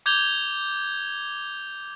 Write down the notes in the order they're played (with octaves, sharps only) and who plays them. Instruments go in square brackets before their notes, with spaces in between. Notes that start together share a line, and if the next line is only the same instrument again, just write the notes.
[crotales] D6 G6 G#6 F7 G7